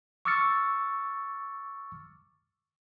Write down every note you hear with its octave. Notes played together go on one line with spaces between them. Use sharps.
C#6 D6 E6 F6 A6 C#7